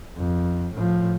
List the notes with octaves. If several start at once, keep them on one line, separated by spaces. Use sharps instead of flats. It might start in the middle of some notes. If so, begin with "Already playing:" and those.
F2
A2 F3